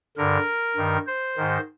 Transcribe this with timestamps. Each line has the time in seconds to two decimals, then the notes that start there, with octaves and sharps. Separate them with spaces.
0.17 G2 D3 A#4
0.76 G2 D#3
1.07 C5
1.37 G#2 D#3